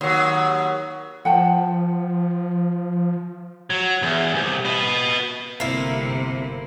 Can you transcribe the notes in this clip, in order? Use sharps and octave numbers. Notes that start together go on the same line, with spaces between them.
D#2 F#3
F3 F#5 G5 A5
F#3
E2
C2
B4 D#5
G1 C3 A#3 E4